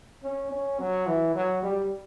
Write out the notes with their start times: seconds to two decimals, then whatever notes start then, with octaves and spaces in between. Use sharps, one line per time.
0.23 C#4
0.51 C#4
0.79 F#3
1.07 E3
1.35 F#3
1.63 G3